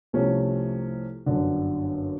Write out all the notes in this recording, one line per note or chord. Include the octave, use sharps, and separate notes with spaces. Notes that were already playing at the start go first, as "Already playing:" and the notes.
C2 C3 F3 A3 C#4
G1 F#2 D3